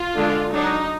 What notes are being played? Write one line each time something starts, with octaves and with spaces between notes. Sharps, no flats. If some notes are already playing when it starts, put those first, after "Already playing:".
Already playing: F4
D3 G#3 D4
F#3 D4 D#4